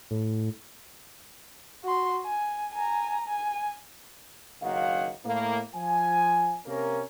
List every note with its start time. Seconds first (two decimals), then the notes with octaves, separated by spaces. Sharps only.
0.11 A2
1.84 F#4 C6
2.25 G#5
2.74 G#5 A#5
3.28 G#5
4.62 F#1 F#2 D#3 A#3 F5 F#5
5.25 A2 A#3
5.75 F3 G#5
6.66 C3 A#3 C#4 A#4